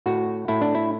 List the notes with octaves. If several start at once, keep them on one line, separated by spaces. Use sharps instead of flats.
A2 F#4
A2 E4
D4
E4